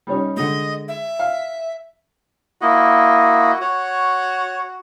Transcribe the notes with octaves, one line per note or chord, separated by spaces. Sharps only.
G3 C#4 D#4
D3 G#3 D#5
E5
F5
A#3 E4 F#4 D#5
F#4 C#5